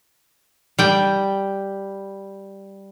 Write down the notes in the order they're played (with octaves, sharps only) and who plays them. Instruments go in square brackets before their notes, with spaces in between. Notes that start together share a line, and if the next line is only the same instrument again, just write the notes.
[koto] G3 G5